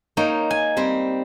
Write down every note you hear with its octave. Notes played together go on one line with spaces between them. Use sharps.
A#3 D#4 C#5 G5
G#5
G3 C4